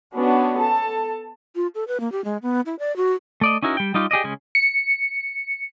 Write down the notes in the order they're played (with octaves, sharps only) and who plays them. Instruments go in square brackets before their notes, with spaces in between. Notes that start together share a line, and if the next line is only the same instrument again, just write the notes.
[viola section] B3 C#4 D4 F#4
A4 A5
[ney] F4
A4
B4
A#3
G4
G#3
B3
E4
D5
F#4
[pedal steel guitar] A3 D5 D#5
C#4 D#4 E4 F#4 A#4
G3 G5
G3 D#4 F4 G4
G4 G#4 D5 D#5
C#3 G#3 C#4
[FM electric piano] C#7